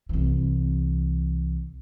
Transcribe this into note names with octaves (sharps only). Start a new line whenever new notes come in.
C2 E3